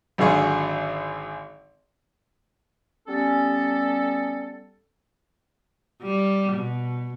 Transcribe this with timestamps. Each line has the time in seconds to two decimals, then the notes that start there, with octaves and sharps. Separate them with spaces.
0.18 G#1 D3 F#3 F4 G#4 C#6
3.08 G3 B3 C#4 A4
6.02 G3
6.53 B2